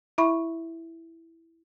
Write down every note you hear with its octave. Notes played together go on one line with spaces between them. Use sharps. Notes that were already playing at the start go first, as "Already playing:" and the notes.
E4 E5 B5 C#6